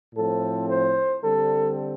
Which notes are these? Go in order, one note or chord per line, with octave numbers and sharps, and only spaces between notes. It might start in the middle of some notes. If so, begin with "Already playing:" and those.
A2 F3 C4 A4
C5
D3 G3 C4 A4